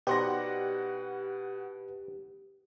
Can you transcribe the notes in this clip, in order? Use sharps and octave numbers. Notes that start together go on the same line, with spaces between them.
B2 D#4 G4 B4 C5 D5 F#5 A#6